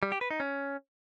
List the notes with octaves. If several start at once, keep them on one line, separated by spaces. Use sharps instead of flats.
G3
G4
B4
D#4
C#4